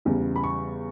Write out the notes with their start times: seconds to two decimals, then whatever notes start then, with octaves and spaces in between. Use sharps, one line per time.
0.05 E2 C#3 G3
0.36 B5
0.44 C#6